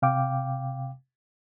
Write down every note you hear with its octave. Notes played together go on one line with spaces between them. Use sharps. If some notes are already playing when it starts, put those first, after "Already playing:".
C3 F5 G5 D6